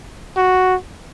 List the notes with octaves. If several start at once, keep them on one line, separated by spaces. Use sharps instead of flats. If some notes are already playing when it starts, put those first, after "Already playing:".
F#4